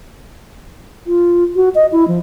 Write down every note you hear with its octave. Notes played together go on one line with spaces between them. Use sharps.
F4
F#4
D#5
E4
F3